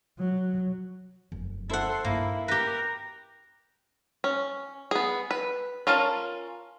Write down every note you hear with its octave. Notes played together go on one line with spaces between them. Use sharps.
F#3
F1 F#2
E4 A4 C5 F#5 C6
G2 A#3 D#4 E4
G4 A#4 B4 A#6
C#4
B3 G#4
B4
C#4 F4 A#4 A5